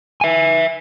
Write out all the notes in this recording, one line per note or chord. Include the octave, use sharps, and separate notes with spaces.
E5 G#5